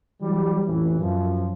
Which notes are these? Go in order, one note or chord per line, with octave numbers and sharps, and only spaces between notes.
E3 F#3 G3
A1 F2 E3
F#2 F3